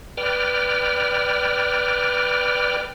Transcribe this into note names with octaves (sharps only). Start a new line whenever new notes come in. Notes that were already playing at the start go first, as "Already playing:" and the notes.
B4 D5 G5 F6